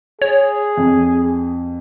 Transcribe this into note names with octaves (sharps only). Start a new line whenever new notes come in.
G#4 C#5
F2